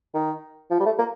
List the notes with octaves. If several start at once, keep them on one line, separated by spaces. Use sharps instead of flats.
D#3
F3
G3
A3
A#3